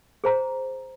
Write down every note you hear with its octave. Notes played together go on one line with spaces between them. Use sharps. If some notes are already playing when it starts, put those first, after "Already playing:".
G#4 C5 A#5